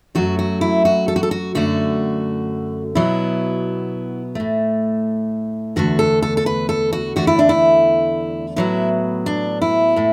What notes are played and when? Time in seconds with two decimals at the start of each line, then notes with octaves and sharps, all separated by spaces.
0.15 F#2 F#3 A3 F#4
0.39 F#4
0.61 E4
0.85 F#4
1.08 A4
1.16 F#4
1.23 A4
1.31 F#4
1.55 F#2 D3 A3 F#4
2.95 B2 F#3 B3 E4
4.35 A2 A3
5.76 E2 D3 A3 F#4
5.99 A4
6.22 A4
6.37 A4
6.46 B4
6.69 A4
6.93 F#4
7.16 E2 D3 A3 F#4
7.27 E4
7.39 D4
7.49 E4
8.56 A2 F#3 B3 E4
9.26 D4
9.62 E4
9.96 A2 A3